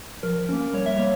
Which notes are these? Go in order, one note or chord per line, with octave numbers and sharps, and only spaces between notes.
F3 A#4
A#3 C#4
G3 C#5
E5
A#3 C#5